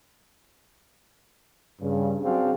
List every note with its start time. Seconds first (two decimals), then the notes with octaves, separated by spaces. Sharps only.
1.81 G2 C#3
2.23 F#3 C4 D4 F#4 G#4 F5